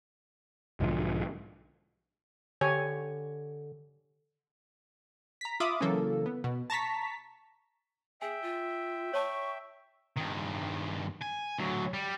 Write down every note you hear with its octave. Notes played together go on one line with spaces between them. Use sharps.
B1 G#2 D3 F3
D3 G4 C#5 G#5
A#5 B6
F4 E5 B5 D6 D#6
C#3 E3 F#3 A#3 A4
B3
B2
A5 A#5 C#6 B6
G#4 E5 G5 G#5
F4
C#5 A5 C#6
G2 D#3
G#5
D2 F#3
G3